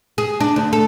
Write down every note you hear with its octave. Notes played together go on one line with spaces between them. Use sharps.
G#4
D4
D2
A4